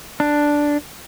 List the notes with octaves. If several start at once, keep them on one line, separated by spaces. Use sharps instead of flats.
D4